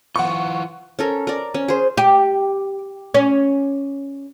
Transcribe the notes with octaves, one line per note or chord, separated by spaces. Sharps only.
E3 F4 F#5 C#6
C#4 A4 A#4
A#4 D5
C#4
G#4 C5
G4
C#4